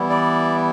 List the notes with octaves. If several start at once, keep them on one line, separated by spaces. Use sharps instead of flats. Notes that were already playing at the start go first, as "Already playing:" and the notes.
Already playing: E3 G3 B3 E4
D5